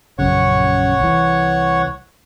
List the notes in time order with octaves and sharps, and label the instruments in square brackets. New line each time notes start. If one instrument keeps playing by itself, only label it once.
[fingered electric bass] A#1 F#2 C#3 [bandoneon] C#5 F#5 C#6
[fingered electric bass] C2 E3